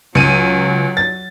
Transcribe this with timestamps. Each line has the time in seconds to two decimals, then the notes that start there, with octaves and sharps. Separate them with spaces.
0.15 C#2 F#3 D#7
0.97 A6